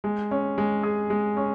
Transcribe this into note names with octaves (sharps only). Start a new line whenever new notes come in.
G#3
C#4
G#3
G#4
G#3
C#4